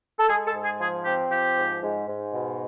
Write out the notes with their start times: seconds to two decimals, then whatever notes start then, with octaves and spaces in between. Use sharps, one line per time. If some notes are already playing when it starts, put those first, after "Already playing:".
0.18 A4
0.28 G#3 G#4
0.46 A4
0.55 G#2
0.63 G#4
0.80 F3 G#4
1.05 C4 G4
1.31 F3 G4
1.56 G#2
1.81 G#2
2.07 G#2
2.33 B2